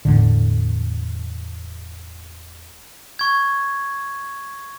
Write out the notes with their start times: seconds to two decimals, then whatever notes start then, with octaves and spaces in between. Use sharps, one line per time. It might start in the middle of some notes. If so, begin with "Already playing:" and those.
0.05 E1 A#1 A2 D3
3.19 C#6 G#6